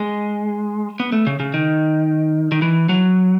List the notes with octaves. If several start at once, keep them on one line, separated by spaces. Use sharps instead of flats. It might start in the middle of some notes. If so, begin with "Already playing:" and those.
Already playing: G#3
B3
A3
C#3
C#3
D#3
D#3
E3
F#3